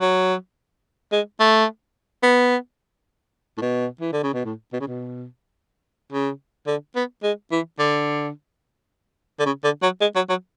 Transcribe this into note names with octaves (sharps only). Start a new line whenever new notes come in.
F#3
G#3
A3
B3
A2
B2
E3
D3
C#3
B2
A2
B2
C#3
B2
C#3
D3
B3
G#3
E3
D3
D3
C#3
D3
F#3
G#3
F#3
F#3